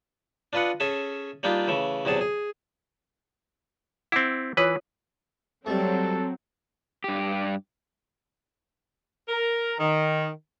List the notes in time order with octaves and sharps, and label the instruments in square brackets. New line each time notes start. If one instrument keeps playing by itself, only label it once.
[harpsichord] D4 F4 B4 D#5 F#5
C#4 G#4 A4 E5
G3 A#3 D4 D#4 F4 G4
C#3 E3 A3
E2 C3 F#3 G#4 A5
G#4
[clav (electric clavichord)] C4 E4 [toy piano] F#5 D6
[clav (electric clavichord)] E3 B4 [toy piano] F4 C#5 D#6
[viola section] F#3 C4 [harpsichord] G3 A3 [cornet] A4
[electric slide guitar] G2 G4
[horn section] A#4
D#3